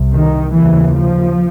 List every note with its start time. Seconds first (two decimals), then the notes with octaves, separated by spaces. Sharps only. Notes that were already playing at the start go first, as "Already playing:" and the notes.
Already playing: C2 C3
0.13 D#3
0.53 D#2 C#3 E3
0.94 F3